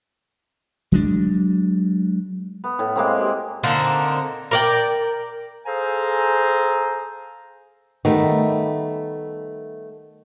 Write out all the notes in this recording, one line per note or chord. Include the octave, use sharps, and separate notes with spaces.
F#3 G#3 D4
B3
A2
G#3 A#3 C4
G4
D3 A#3 C4 D#4
A#4 D5 G5
G#4 A4 C5 F5 G#5 A#5
D#3 G3 A3 B3